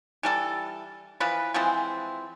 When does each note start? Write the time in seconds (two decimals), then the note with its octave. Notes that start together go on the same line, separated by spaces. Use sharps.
0.23 E3 G3 A4
1.20 E3 F3 B4
1.54 E3 F3 G#3 C4